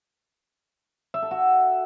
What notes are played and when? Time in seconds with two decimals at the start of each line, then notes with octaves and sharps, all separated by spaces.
1.14 E5
1.22 A4
1.31 F#4